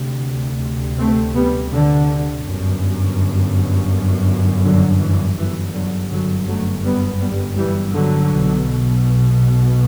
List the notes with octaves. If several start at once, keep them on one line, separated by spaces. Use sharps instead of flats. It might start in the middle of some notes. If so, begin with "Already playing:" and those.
Already playing: D2 C3
A3 C4
G3 B3
D3
G1 F#2
D3 F#3
E3
G1 F#2 E3
D3 F#3
D3 F#3
F#3 A3
G3 B3
G3 B3
E3 G3
D3 F#3
B1 B2